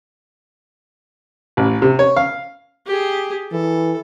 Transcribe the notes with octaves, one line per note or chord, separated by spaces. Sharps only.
A1
C3
C#5
F5
G4 G#4
E3 A4